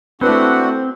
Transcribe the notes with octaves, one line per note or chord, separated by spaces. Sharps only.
A3 C4 D4 E4 F#4 B4 F#5